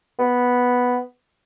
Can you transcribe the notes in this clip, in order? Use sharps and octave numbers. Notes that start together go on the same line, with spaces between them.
B3